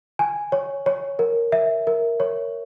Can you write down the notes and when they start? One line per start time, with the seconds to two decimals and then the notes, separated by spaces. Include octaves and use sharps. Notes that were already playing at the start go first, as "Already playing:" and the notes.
0.19 G#5
0.52 C#5
0.86 C#5
1.19 A#4
1.52 E5
1.87 A#4
2.20 C#5